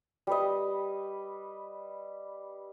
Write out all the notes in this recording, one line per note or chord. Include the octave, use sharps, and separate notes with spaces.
G3 B4 D#5